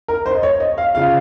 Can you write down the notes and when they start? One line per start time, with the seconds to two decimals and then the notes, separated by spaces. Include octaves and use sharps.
0.08 A#4
0.26 C5
0.35 D#5
0.43 C#5
0.60 D#5
0.78 F5
0.95 C#3 F3 F5